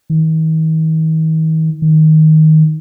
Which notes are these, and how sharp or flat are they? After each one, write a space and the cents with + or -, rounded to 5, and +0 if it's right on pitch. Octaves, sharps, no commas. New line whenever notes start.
D#3 +40
D#3 +10